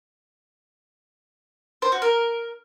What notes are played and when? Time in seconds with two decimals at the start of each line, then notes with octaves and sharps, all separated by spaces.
1.82 C5
1.92 F#4
2.02 A#4